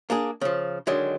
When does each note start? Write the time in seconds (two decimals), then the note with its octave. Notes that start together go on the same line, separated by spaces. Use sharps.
0.10 A#3 D4 G#4
0.41 C#3 F3
0.87 D3 D#3 F#3 G#3